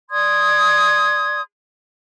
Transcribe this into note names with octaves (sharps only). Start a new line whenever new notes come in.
D5 C6 D#6 G#6